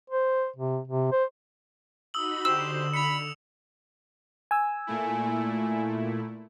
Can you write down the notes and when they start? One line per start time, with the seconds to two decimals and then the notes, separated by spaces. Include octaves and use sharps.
0.10 C5
0.56 C3
0.87 C3
1.12 C5
2.14 D#4 F#4 B5 D#6 E6 F#7
2.45 D3 G4 C5 E6 E7
2.94 B5 C#7 F7
4.51 G#5 E6
4.87 A#2 A3 E4